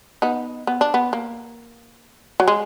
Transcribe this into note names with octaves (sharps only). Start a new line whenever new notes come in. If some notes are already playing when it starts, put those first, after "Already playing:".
B3 D#4
B3
D4
B3
A#3
F#3
G#3